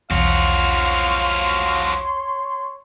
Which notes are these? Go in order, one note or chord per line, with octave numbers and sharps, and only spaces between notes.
B1 E2 F3 F#4 C#5 F5 C6